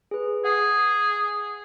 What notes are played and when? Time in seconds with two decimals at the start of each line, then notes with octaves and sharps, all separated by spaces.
0.11 G#4 B4
0.45 G#4 F#5 C7